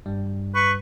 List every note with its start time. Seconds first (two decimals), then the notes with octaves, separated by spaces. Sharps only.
0.06 G2 G3
0.54 B4 C#6